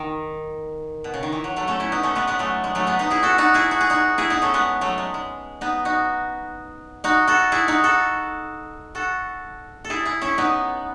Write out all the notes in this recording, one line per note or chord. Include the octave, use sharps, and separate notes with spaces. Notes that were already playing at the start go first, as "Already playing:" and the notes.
Already playing: D#3
B2
C#3
D#3
E3
F#3
F#3 A3
A3 C#4
C#4 E4
B3 D#4
A3 C#4
G#3 B3
G#3 B3
F#3 A3
G#3
F#3 A3
G#3 B3
B3 D#4
E4 G#4
F#4 A4
D#4 F#4
E4 G#4
F#4
G#4
D#4 F#4
E4 G#4
B3 D#4
A3 C#4
G#3 B3
F#3 A3
G#3
G#3
B3 D#4
D#4 F#4
D#4 F#4
F#4 A4
E4 G#4
D#4 F#4
F#4 A4
F#4 A4
A4
E4 G#4
E4 G#4
C#4 E4
B3 D#4